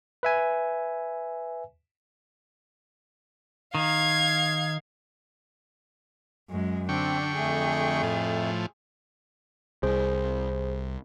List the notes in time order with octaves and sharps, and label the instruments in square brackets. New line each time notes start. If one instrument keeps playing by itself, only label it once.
[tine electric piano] B4 E5 G#5
[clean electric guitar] D#3 [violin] F5 G#6
[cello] F#2 G#3
[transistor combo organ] D3 G5 C#6 [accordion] C4 [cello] D4
[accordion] F2 A3 [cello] G#4
[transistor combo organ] A2 F3
[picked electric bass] C2 [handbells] G#4 C5